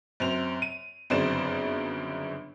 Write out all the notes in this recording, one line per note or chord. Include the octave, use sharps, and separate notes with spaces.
F#2 C4 F7
D#7
G1 F#2 C#3 C4 D5 E7